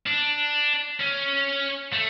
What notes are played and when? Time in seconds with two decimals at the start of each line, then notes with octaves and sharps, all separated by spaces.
0.07 D4
1.00 C#4
1.93 A3